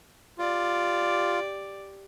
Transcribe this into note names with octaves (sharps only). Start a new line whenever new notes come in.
F4 G4 D5